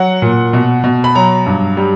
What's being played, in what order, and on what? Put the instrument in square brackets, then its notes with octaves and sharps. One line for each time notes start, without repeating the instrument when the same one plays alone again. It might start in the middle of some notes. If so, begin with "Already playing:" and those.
Already playing: [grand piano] F#3 F#5
A#2
B2
B2
B5
F#3 A#5
G2
G3